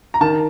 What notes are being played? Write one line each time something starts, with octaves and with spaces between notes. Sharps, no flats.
A#5
D#3 A5